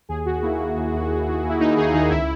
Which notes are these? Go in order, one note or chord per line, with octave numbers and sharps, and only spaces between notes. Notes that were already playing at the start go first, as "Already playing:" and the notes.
D#2 G#4
D#2 F#4
A#3 E4
A#3
D#2
D#2
D#2
D#2
D#2
E4
A#3 D#4
D#2 G#4
D#3 D#4
C#2 E4